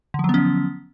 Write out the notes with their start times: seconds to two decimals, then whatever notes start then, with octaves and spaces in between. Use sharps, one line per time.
0.14 D3
0.19 F3
0.24 F#3
0.29 B3
0.34 C#4